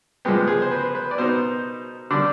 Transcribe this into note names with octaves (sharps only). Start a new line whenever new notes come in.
G#2 F3 G#3 B3 G4
G#4
C5
B4
B4
D5
B2 B3 D#4 C5
D3 G3 D4 D5